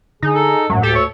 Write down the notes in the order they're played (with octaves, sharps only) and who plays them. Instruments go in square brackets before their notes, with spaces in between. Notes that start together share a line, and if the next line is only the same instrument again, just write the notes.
[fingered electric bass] D3 [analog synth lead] D#4 [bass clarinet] G#4
[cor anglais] A4
[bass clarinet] F#2 [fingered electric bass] A2 G#3 [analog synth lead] F#3
[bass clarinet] D2 [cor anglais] G4 [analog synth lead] A4
[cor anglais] C#5